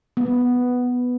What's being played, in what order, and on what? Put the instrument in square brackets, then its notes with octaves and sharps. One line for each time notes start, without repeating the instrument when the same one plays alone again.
[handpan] B3